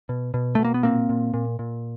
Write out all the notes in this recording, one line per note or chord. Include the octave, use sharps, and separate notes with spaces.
B2
B2
B2 A3
A#3
B3
A#2 A#3 C4
A#2
A#2
A#2